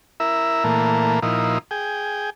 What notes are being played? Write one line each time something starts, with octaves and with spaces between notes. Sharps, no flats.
E4 A#4 E5
A#2 E3 A3 A#3
A#2 F3 D#4 E4
G#4 G5